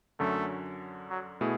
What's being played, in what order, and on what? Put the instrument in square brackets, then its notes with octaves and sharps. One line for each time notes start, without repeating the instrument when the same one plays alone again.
[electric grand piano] F#2 D3 F#3 C#4 [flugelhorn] A3
[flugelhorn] F#3
[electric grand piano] B2 A3 E4 G#4